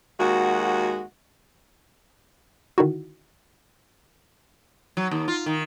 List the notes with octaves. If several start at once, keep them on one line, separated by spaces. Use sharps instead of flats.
D#2 G#3 F#4
D3 D#3 D#4 E4 F#4
F#3
D#2
F4
D#3